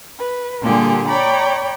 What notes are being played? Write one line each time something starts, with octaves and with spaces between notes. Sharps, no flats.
B4
A#2 D3 G3 A#3 G4 G#4
C#5 D5 G5 A#5 B5